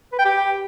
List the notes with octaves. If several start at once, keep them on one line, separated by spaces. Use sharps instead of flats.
B4
G5
G4